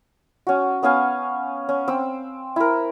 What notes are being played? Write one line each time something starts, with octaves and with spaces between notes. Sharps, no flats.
C#4 F#4
B3 C#4 F5 G#5
C#4
C4 E6
E4 A#4